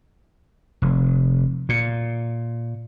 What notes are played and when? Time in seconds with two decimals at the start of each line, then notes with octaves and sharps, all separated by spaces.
0.82 F1
1.69 A#2